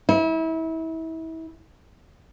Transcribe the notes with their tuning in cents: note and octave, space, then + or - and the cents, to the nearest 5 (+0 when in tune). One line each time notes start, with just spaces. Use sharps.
E4 -30